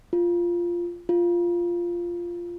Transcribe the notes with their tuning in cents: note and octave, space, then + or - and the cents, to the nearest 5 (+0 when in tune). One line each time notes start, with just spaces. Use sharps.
F4 -5
F4 -5